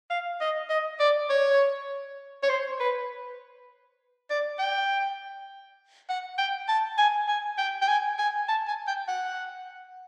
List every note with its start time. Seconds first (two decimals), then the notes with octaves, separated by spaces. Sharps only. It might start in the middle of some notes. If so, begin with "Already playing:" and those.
0.10 F5
0.41 D#5
0.70 D#5
1.00 D5
1.30 C#5
2.43 C#5
2.49 C5
2.80 B4
4.30 D5
4.59 G5
6.09 F#5
6.38 G5
6.68 A5
6.98 G#5
7.28 G#5
7.58 G5
7.82 G5
7.88 G#5
8.19 G#5
8.48 A5
8.68 G#5
8.87 G5
9.08 F#5